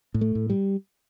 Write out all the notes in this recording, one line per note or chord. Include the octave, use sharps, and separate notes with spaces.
A2
A3
A2
G3